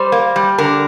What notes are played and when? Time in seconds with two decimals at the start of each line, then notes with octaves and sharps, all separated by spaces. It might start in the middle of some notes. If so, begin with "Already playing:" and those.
Already playing: G3 C5
0.12 A#3
0.36 G3
0.58 D3 A#4